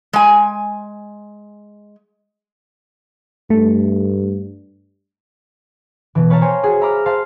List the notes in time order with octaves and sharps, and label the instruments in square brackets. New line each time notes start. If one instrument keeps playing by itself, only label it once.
[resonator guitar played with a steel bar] G#3 G#5
[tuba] G2 [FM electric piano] A3
[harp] B2 E3
B4 C#5 F5 A5 A#5
C5 C#5 G5 G#5
F#4 G#4
E5 A#5 B5 D6 F6
C5 F5 A5 C7